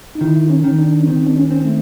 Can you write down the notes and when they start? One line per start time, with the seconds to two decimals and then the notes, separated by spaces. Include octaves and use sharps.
0.15 D#4
0.21 D#3 E4
0.50 C#4
0.64 D#3
0.79 D4
1.00 C#4
1.08 D#3 C4
1.27 D4
1.36 C#4
1.50 C4
1.65 A3